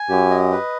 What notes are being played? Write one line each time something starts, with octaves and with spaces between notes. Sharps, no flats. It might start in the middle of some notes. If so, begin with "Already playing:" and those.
Already playing: G#5
F#2 G4
D#5
B4